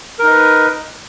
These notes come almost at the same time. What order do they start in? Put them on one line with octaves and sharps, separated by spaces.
A#4 D#4 D#5 B4